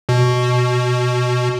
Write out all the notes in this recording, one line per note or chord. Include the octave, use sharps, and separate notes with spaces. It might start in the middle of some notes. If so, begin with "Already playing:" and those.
B2